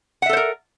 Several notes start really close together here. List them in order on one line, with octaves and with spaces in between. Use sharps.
F#5 E5 A4 C5 A#4